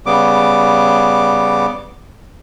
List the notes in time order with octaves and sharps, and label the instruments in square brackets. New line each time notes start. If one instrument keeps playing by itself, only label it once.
[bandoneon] C#3 G3 B3 D6